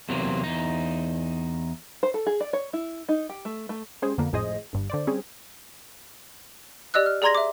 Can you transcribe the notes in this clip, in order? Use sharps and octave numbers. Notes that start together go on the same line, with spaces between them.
E2 C3 F#3 A#3
E2 D#4
C5
A4
G#4
D5
C#5
E4
D#4
G4
A3
A3
G3 G#3 C#4 G#4 C5
F2 D3 A#3 B3
G#1 F2 A2 G#4 C5 D#5
G1 G2
D3 C5 D5
G3 C4 C#4 G#4
G4 D5 D#5 E6 F#6
F6
G#4 D5 A#5 C6 G#6 A#6
E5 D6